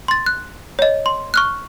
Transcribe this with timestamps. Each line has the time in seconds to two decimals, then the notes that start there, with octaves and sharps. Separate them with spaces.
0.08 C6 A6
0.26 F#6
0.79 C#5 D#5
1.06 C6
1.34 C#6 F6 F#6